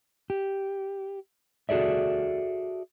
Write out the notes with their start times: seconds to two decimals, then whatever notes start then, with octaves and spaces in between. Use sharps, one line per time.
0.30 G4
1.69 F#4 G#4 A4 D5 E5